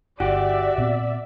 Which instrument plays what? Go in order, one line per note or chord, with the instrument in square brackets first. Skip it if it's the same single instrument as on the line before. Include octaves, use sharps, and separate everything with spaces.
[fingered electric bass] G1 [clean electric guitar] F#4 G4 [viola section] D5 E5 [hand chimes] F#5
[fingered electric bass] A#2 B3 C4